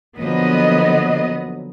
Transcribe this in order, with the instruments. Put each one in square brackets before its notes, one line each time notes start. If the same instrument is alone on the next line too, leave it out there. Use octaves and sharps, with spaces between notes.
[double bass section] D3 F#3 [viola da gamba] F3 A#3 [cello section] B3 D#5